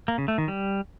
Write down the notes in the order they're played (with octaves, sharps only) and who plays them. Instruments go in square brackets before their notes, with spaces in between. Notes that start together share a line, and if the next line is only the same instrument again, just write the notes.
[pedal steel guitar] A#3
C#3
A3
D#3
G3